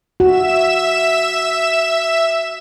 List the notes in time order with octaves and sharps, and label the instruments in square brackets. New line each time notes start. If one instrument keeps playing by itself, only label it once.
[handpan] F#4 [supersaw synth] E5 E7